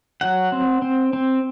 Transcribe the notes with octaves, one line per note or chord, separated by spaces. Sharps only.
F#3 F#5
C4
C4
C4